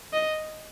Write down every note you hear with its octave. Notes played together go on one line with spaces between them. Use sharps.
D#5